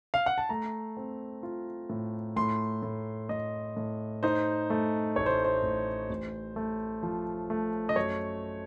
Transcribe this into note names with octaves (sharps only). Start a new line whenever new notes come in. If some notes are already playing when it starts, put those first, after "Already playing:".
F5
F#5
A5
A3 A#5
C4
F4
A2
A2 C6
A2
A2 D#5
A2
D#4 C5
A3
A1 C#5
C5
C5
A1
A1
A3
F3
A3
D#5
F#2 C#5